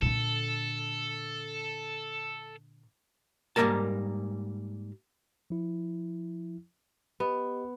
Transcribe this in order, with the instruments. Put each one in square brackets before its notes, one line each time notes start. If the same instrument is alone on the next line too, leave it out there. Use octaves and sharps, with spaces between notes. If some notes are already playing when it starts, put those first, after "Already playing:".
[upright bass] A#2 D3 [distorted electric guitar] A4
[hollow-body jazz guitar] G#2 G3 G#3 A#3 A#4 A5
[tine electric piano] F3 E4
[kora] B3 [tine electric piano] G4 D#5